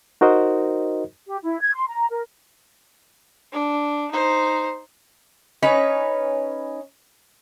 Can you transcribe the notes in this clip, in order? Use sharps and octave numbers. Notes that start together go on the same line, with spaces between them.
D#4 F#4 A#4 C5 D#5
G4
E4
G#6
C6
A#5
A#4
D4
D#4 C5
C#4 D#4 B4 C#5